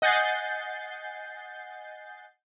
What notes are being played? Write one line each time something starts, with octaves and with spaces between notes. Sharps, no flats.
D#5 F#5 G#5 G6 A6 C7